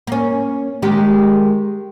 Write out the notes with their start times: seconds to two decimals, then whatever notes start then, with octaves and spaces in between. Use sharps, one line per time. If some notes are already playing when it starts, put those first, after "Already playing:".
0.07 A#3 C#4
0.82 D#3 G#3 G4